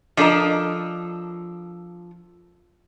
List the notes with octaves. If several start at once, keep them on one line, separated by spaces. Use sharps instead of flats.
F3 D4 A4 A#4 D#5